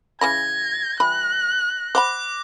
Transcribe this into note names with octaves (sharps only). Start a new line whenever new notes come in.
C#3 E3 B5 G#6 A#6
E3 G3 B5 F#6
C5 F#5 B5 D6 F#6